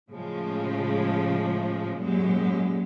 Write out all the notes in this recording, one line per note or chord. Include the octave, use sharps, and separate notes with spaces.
A2 C#3 F3 G#3
F#2 A#2 F#3 G#3 G4